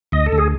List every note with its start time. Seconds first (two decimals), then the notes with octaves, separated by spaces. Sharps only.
0.12 D2 D#5
0.26 A4
0.32 D2
0.38 G#4